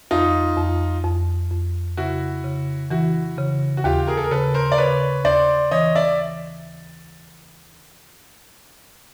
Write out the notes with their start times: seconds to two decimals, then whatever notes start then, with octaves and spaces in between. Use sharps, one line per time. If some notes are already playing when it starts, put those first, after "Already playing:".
0.11 F2 D#4 F4
0.57 F2
1.04 F2
1.51 F2
1.97 C#3 E4 F#4
2.44 C#3
2.91 E3 E4 F#4
3.38 C#3
3.77 F#4
3.84 D#2 F4 G4
4.07 G#4 A#4
4.17 A4
4.24 A#4
4.31 C#3 A4 B4
4.54 A#4 C5
4.72 D5
4.78 C#3 B4 C#5
5.25 D#2 C5 D5
5.71 E3 C#5 D#5
5.95 D5 E5